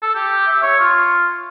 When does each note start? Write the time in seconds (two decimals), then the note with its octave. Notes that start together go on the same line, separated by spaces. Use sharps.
0.02 A4
0.15 G4
0.47 E5
0.62 C#5
0.80 F4